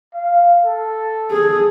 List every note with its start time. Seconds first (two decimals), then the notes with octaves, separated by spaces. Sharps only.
0.14 F5
0.65 A4
1.31 G#4